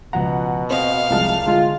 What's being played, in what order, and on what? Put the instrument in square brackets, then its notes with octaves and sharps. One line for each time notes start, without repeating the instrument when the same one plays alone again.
[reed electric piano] C#2 F3 A#5 [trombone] B2 [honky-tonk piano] F#5
[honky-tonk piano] C4 [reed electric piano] C5 D#5 [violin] F5
[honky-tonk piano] C2 A5 F6 [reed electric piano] F3 G#3 C4
[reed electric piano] D3 G#3 [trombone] F4